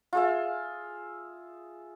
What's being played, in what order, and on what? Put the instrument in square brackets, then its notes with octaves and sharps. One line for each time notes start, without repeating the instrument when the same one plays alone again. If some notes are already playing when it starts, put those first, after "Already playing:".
[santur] F4 G#4 E5